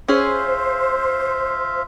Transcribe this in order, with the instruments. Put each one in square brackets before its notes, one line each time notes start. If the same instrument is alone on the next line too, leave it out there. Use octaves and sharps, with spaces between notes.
[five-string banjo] C#4 G#4 [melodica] F4 E5 F5 [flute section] C5